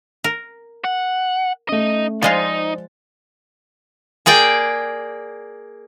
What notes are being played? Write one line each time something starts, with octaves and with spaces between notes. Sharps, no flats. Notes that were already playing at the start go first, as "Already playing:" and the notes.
A#4
F#5
A3 C#4 D#4 D#5
F3 G#3 D#4 F4 C5 D5 A6
A#3 G#4 D5 G5